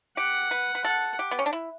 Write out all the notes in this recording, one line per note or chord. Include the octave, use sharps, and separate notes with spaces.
G4 F#5
B4
B4
A4 F#5
G4
B3
C#4
D4
E4